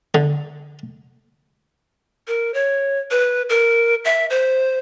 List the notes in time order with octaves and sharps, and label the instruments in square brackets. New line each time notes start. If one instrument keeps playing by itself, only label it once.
[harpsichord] D3
[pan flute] A#4
C#5
B4
A#4
E5
C5